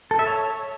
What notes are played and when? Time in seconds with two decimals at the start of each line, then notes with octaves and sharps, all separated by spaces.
0.11 A4
0.19 E5
0.27 C#5